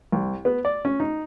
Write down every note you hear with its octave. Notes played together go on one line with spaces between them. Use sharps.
C2
B3
D5
C#4
D#4